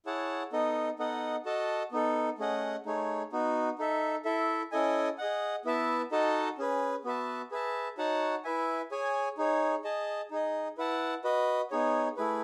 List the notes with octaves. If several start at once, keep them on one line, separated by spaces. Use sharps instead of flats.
E4 G#4 C#5 F#5 A5
B3 D#4 A4 D#5
B3 D#4 A4 D#5 F#5
F#4 A4 D#5 A5
B3 D#4 A4
A3 C#4 G#4 D#5 F#5
A3 D#4 G#4 C#5
B3 D#4 F#4
D#4 A4 E5
E4 A4 E5
C#4 E4 A4 D#5 G#5
G#4 D#5 F#5
B3 E4 B4 E5 A5
D#4 F#4 A4 D#5 A5
C#4 G#4 B4
B3 F#4 B4 E5 A5
G#4 B4 E5 A5
D#4 F#4 C#5 F#5 A5
E4 B4 E5 G#5
G#4 C#5 G#5
D#4 G#4 C#5
G#4 D#5 A5
D#4 G#4 D#5
E4 B4 F#5 A5
F#4 B4 D#5
B3 D#4 G#4 C#5
A3 E4 G#4 B4